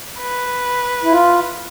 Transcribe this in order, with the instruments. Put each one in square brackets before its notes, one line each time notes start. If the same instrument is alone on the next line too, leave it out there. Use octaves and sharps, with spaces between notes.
[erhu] B4
[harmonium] E4
F4